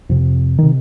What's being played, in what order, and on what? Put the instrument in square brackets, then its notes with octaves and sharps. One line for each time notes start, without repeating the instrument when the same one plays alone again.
[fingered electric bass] F2 C3
C3 D#3